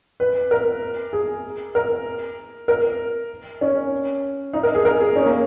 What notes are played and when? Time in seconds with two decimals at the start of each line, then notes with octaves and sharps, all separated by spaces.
0.20 B4
0.51 A#4
1.13 G#4
1.75 A#4
2.68 A#4
3.61 C#4
4.53 D#4
4.63 A#4
4.75 G#4
4.85 A#4
5.00 G#4
5.16 C#4
5.26 A#3